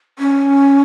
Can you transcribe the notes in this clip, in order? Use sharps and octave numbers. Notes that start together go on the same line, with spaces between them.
C#4